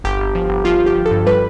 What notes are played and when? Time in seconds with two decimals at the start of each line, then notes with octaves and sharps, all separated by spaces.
0.04 G1 G4
0.20 G1
0.35 F3
0.49 G1
0.65 F3 F4
0.80 F3
0.86 G4
0.96 F3
1.06 A4
1.11 G2
1.26 G3 B4